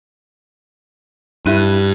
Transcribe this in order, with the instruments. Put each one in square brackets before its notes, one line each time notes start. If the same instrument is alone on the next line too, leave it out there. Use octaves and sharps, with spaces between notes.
[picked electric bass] G2 [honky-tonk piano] E4 F#6 D#7